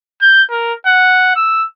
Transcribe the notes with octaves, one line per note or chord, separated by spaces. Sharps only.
G6
A#4
F#5
E6